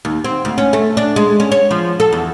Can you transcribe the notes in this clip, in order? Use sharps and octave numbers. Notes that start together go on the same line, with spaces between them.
D#2
C4
D2
C#4
A3
D4
G#3
C#4
C#5
F3
A4
E2